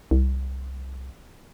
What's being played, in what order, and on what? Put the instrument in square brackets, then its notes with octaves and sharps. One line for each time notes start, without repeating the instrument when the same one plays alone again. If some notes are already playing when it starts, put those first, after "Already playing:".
[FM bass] C2